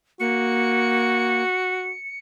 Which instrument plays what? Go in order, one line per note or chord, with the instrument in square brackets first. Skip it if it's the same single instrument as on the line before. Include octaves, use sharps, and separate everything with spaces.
[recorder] A#3 [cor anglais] F#4 [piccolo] C#7